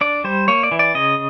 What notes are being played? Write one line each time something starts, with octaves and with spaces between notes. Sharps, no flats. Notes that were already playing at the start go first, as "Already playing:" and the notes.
D4 D5
G3 C5
A#3 C#5
D5
E3
D5
C#3 D#5